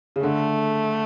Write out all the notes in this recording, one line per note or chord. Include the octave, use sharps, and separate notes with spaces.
C#3
D3 A3